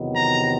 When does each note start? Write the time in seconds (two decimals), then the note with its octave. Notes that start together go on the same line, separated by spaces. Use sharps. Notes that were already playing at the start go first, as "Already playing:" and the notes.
Already playing: E2 C3 D#3 F#3 B3
0.15 A#5